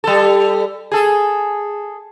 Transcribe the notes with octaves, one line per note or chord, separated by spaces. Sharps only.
G3 A4
G#4 A4